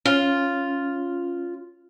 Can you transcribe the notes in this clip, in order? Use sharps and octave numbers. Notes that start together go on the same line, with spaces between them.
C#4 F4